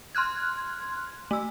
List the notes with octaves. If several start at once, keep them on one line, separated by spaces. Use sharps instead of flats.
C6 F6 F#6 G#6
A3 E6